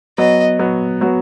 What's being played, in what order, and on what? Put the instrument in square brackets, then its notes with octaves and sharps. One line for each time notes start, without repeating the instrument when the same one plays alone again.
[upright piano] F#3 B3 F#4 [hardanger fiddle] D#5
[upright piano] F#3 B3 F#4
F#3 B3 F#4